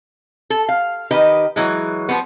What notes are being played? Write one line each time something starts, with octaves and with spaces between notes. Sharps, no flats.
A4
F5
D#3 G4 B4 D#5
E3 F#3 G#3
F3 G3 B3